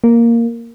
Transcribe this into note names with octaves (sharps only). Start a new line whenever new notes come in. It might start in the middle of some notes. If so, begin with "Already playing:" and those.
A#3